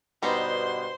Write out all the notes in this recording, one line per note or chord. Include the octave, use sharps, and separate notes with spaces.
G2 B2 G3 B3 D#4 C5 C6